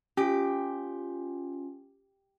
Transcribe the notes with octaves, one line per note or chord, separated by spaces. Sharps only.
C#4 F4 G4